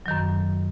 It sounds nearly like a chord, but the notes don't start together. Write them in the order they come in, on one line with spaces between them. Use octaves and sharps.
F#3 D#3 F#2